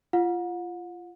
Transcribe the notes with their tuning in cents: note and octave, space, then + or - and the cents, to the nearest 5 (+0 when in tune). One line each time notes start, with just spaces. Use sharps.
F4 -20 F#5 -40